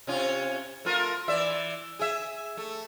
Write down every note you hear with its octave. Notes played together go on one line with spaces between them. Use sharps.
C3 C#4 F4
A3 F4 A#4
E3 D5 E5
G#4 E5
A3